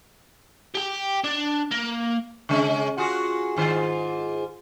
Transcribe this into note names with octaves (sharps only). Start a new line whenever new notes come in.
G4 G5
D4
A#3
C#3 G#3 C#4
F4 F#4 G#4
G#2 D#3 F4